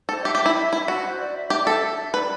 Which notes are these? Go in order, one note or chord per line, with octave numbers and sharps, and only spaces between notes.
A4 C5
G4 E5
G4
E4
E4
F#4 B5
C5
C5
D5
E5
G4 E5
A4
B4 D5